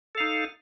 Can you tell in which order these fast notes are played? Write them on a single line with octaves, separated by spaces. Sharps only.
A4 F5 D#4